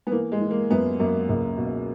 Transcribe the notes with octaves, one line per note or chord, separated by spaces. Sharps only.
B3
E3 A#3
G#3
E3
A#3
F#2 B3
F#2 A#3
C#2 A#3
B2